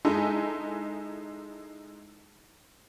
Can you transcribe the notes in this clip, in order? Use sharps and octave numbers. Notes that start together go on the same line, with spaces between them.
G#3 D#4 E4 A4